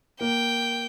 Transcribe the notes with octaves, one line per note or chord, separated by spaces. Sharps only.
A#3 G5